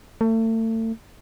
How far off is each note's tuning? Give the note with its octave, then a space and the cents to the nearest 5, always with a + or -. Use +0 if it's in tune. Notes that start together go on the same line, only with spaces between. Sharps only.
A3 +35